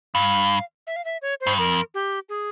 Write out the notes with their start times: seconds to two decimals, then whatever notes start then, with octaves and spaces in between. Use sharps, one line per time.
0.14 G2 F5
0.87 E5
0.96 F5
1.05 E5
1.22 C#5
1.41 C5
1.47 G2
1.58 F2 A#4
1.94 G4
2.29 G#4